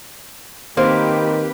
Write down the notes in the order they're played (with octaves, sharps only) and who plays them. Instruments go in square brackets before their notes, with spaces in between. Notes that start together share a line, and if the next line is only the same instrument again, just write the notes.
[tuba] D#3 [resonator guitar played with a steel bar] A#3 [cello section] C4 G4 B4 [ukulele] C5